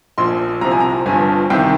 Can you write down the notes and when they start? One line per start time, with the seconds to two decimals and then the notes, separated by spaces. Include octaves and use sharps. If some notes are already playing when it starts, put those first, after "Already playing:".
0.18 A#1 A#2 F3 C6
0.61 C2 C3 F3 A#5
0.71 G#5
0.80 A#5
1.06 G1 G2 F3 G#5
1.50 C2 C3 D#3 G5